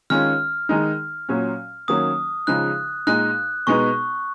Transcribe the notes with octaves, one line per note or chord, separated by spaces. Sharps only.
D#3 G#3 C#4 F4 F6
D#3 G#3 D#4
A#2 F#3 C#4
D#3 F#3 A#3 C#4 D#6
C#3 F3 G#3 D#4 F#6
A#2 G#3 D#4 F#6
B2 G#3 B3 D#4 C#6